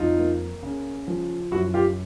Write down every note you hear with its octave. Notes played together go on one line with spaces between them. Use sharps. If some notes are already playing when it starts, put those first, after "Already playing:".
Already playing: F2 D#4 F4
A#3
C#3
F3
F#2 E4 F#4
F4 G4